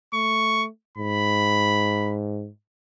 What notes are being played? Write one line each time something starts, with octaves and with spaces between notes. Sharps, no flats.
A3 C#6
G#2 B5